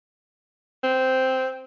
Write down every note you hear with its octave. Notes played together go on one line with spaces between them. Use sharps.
C4